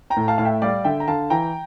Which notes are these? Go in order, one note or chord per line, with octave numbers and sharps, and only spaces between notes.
G5 A#5
A2
F5 A5
A2 F5
E5 G5
G3 D5 F5
D3 E5 G5
A#5
D3 F5 A5
E3 G5 A#5